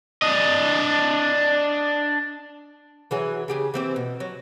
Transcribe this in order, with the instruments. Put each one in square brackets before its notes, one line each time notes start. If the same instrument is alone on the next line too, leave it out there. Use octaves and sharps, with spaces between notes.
[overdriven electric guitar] D4 D#5
[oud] E3 F#3 G#4
C#3 G4 G#4
E3 C4 G4
B2
F#3